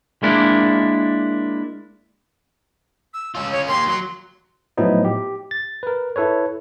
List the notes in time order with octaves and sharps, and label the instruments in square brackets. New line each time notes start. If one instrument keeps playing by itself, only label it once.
[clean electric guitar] G#3 A#3 D4 E4
[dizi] E6
[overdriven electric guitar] C#4 F4 [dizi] E6
[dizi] C#5
[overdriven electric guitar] A#3 G4 [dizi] C6
[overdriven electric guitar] F#3 [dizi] C6
[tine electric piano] A2 F3 F#3 B3 D#4 E4
G4
A6
A#4 B4
E4 A4 B4 C#5